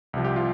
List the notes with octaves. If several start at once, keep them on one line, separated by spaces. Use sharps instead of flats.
C2 C3 F3
G4
F4